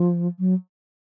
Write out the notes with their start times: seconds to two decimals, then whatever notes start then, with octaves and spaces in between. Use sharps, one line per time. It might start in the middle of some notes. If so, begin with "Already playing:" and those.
Already playing: F3
0.39 F#3